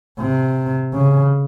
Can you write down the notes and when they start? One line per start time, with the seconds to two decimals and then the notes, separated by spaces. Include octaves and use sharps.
0.20 C3
0.93 C#3